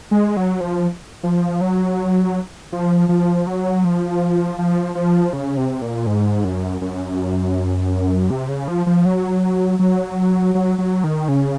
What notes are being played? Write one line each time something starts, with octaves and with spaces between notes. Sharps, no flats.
G#3
F#3
F3
F3
F#3
F3
F3
F#3
F3
F3
F3
C#3
C3
A#2
G#2
F#2
F#2
C3
C#3
F3
F3
F#3
F#3
F#3
F#3
D#3
C#3